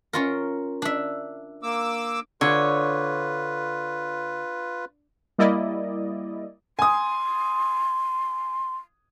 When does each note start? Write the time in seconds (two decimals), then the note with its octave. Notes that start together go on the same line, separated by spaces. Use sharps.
0.13 C#4 F4 A#4
0.82 D4 E5
1.63 A#3 D6 E6
2.41 D3 F4 B4 C#5
5.39 G3 A#3 E4 D5 D#5
6.79 G#5 C6 D#6